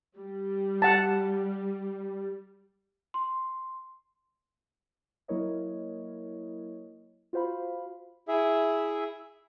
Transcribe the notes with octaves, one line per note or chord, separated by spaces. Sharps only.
G3
F#5 A5
C6
F#3 A#3 E4 A#4 C#5 D#5
F4 F#4 C5 F5 B5
E4 G#4 E5